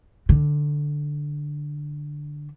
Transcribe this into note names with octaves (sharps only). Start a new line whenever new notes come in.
D3